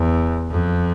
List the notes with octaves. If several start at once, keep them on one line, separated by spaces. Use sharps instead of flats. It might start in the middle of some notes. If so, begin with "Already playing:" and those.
Already playing: E2
F2